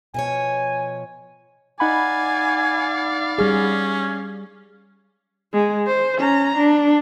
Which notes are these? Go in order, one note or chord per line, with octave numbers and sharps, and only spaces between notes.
B2 F3 C#5 G#5
D#4 D5 F5 F#5 G#5 B5
G3 C#4 G#4
G#3
C5
C#4 A#5
D4